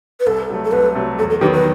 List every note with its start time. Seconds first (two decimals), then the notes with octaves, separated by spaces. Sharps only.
0.20 B4
0.26 C2 A4
0.50 C3 F#3 A3
0.65 A4
0.72 C2 B4
0.95 C3 F#3 A3
1.18 E2 A4
1.30 A4
1.41 D#3 F#3 B3 G4
1.53 B4